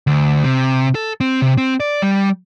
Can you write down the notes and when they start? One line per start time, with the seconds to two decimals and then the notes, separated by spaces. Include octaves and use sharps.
0.07 D2
0.44 C3
0.95 A4
1.20 C4
1.42 C3
1.58 C4
1.80 D5
2.02 G3